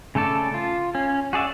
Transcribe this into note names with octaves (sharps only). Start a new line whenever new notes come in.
C#3 A3 A4 D5
F4
C#4
F#4 G#4 D5 E5